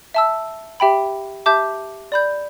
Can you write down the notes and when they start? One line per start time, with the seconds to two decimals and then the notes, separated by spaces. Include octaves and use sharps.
0.14 E5 A5 E6
0.80 G4 E5 G5 B5
1.46 G4 E5 A5 D6 G6
2.12 D5 B5 G6